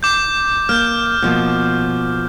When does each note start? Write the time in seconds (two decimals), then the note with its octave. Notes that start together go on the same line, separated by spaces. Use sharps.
0.03 D6 G6
0.69 A#3 F6 G6
1.22 B2 F3 A#3